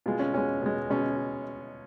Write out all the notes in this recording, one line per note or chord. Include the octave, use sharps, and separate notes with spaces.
B2 G#3 F4
C#4
B2 G#3 C#4
B2 G#3
B2 G#3 C#4